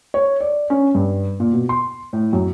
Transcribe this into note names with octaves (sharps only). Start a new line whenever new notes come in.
C#5
D5
C#4
G2
A#2
B2
C6
A2
F#2